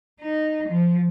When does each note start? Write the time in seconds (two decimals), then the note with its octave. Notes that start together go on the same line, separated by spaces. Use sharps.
0.22 D#4
0.69 F3